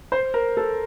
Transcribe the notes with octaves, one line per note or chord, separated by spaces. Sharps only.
C5
A#4
A4